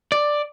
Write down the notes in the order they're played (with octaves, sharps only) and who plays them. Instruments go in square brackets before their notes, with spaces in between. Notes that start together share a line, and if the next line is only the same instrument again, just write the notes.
[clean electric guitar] D5